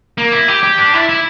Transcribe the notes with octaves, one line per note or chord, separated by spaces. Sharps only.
A#3
E4
G4
G4
D4
E4
E4